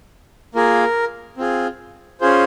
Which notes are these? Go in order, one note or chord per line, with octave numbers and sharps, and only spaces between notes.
A#3 F4 G#4 A#4
C4 F4 G#4
C#4 F4 G#4 C5